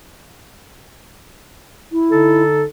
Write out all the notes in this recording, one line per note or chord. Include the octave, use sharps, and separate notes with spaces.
E4
D3 D#4 A4